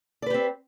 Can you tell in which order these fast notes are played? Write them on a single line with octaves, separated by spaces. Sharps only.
D5 B4 G4 C4